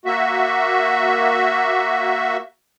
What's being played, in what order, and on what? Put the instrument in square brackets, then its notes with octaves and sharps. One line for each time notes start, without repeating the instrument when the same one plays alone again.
[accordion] A#3 F#4 E5